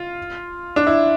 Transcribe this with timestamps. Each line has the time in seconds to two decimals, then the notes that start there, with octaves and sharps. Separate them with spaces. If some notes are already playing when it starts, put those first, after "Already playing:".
Already playing: F4
0.76 D4
0.87 E4